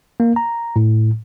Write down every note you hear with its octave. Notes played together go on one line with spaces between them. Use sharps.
A#3
A#5
A2